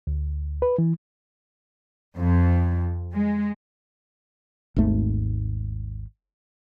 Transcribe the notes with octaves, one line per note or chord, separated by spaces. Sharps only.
D2
B4
E3
F2
G#3
G#1 D#2 G#2 A3